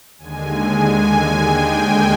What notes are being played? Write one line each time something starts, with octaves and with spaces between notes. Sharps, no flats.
D#2 D3 G#3 G#5
G#5
G5